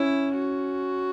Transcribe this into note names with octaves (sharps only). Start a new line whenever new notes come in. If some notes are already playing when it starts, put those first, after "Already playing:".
Already playing: C#4 E4
F#4